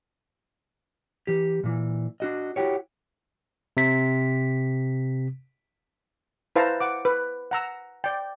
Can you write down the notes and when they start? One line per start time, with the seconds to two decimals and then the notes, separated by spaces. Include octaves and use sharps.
1.27 E3 G4
1.64 A#2 E3
2.20 D4 F#4 D#5
2.56 E4 F#4 G4 C#5
3.77 C3 B6
6.56 E4 B4 C5 F5 A5 A#5
6.80 F#5 D6
7.05 B4
7.51 F#5 A#5 E6
8.04 D5 G5